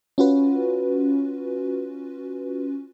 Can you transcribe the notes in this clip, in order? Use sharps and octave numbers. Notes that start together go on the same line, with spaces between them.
C#4 F4 F#4 B4